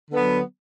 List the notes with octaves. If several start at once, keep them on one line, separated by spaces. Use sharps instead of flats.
D3 F#3 B3